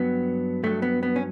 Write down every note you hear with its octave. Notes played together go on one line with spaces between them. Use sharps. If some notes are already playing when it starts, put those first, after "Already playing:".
Already playing: G2 F#3 B3
G2 F#3 A3
B3
B3
C#4